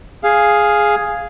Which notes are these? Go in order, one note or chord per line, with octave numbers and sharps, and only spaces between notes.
G#4 F5